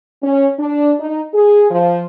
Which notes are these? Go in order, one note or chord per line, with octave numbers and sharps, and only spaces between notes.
C#4
D4
D#4
G#4
F3